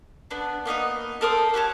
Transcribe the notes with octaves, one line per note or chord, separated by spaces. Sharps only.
B3 D4
A#3 B3 D#4 D#5
A4 A#4 C5 D#6
F#4 G4 C#5 A5